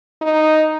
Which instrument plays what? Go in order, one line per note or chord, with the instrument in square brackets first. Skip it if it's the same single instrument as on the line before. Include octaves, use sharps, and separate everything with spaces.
[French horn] D#4